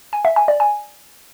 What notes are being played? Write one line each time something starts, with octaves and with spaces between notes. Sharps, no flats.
G#5
E5
G#5
D5
G#5